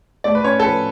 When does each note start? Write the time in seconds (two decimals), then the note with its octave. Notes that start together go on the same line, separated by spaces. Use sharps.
0.24 A3 D5
0.35 B4
0.44 C#4 C#5
0.60 A4
0.64 F3 B4